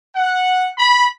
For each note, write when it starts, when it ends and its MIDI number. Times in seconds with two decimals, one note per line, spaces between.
0.15 0.68 78
0.78 1.07 83